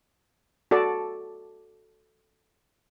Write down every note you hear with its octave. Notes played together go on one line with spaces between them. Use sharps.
F#4 A4 D5 A5